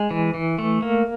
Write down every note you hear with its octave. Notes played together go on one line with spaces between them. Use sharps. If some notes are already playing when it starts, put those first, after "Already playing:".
Already playing: G#3
E3
E3
A3
A#3